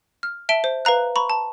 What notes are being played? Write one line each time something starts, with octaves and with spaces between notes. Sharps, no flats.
F6
E5 A5 D7 G7
C5
B4 F5 A#5 F#6
A#5 B5 C#6
A5